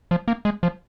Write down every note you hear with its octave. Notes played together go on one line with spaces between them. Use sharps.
F3
A#3
G#3
F3